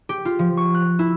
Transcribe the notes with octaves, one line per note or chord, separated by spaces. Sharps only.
G4
F4
F3
C#6
F#6
E4